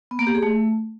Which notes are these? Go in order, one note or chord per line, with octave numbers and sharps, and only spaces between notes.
B3
A#3
G4
G#4
A3